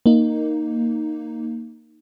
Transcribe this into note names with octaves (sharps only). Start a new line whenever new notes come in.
A#3 D#4